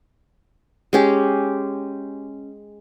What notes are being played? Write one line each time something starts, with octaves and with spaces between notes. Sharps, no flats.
G#3 C#4 G4